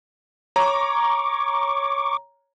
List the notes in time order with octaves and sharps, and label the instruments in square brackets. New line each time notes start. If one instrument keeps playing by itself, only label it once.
[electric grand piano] C#5 A#5 [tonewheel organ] C#6 D6